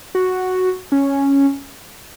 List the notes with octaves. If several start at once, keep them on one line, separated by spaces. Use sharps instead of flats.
F#4
C#4